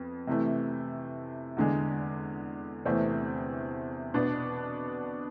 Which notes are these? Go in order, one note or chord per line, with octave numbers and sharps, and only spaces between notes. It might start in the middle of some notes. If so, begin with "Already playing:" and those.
Already playing: F2 B3
C3 E3 A3
E2 D3 G#3
E2 C3 E3 A3 C4
B2 B3 D4